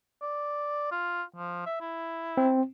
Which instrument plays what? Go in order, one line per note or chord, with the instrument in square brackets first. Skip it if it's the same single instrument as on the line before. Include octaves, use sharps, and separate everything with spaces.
[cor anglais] D5
F4
F3
E5
E4
[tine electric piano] C4